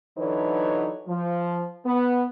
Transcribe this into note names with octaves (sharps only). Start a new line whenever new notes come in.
D3 E3 F#3 D#4 B4 C#5
F3
B3